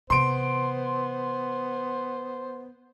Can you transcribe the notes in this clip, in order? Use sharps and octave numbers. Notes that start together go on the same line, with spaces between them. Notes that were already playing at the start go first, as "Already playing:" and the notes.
C3 E3 B3 C5 C6 D7